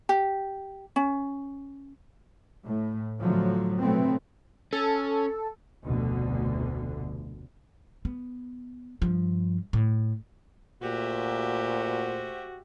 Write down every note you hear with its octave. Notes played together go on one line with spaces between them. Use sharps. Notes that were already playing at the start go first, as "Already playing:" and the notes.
G4
C#4
A2
A2 D3 F3 F#3
B2 F#3 A3 B3 C4
C#4 A4
F1 D2 B2 D3
B3
G2 F3
A2
A#2 A3 F#4 G4 C5 E5